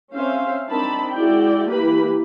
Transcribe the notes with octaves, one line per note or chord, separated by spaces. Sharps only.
C4 C#4 C5 E5 F5
C4 D4 D#4 A#4 A5 B5
G#3 E4 F#4 D5 G5
E3 A#3 G4 B4 B5